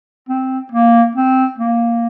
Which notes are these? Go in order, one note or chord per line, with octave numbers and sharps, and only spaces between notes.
C4
A#3
C4
A#3